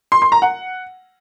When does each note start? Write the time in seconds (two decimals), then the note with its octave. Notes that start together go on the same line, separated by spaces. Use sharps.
0.12 C6
0.22 C6
0.32 A#5
0.42 F#5